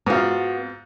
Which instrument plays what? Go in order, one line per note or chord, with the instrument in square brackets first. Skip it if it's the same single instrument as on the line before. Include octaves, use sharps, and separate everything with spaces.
[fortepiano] G#2 F4 [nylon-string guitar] B3 F#4